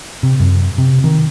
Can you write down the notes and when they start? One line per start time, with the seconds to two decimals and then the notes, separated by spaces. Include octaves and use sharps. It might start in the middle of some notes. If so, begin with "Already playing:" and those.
0.23 C3
0.40 F#2
0.78 C3
1.04 D#3